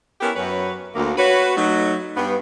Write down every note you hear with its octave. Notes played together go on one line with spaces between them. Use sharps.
B3 C#4 E4 G4 A#4 B4
F#2 B4 C#5
D2 A#3
F#4 B4 C#5
F#3 A3 D#4
G2 B3